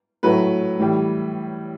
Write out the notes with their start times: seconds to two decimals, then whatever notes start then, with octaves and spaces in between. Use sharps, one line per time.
0.23 A2 F#3 A3 B4
0.79 A2 E3 G3